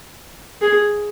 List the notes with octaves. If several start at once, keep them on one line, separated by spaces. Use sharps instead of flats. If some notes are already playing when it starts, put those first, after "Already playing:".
G#4